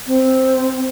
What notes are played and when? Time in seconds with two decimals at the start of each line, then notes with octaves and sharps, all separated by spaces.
0.07 C4